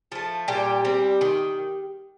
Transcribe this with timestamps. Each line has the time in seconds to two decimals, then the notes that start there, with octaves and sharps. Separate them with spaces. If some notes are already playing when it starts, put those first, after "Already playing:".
0.12 F3 A3
0.48 A#2 G3 G4
0.85 G3 C4
1.21 D#3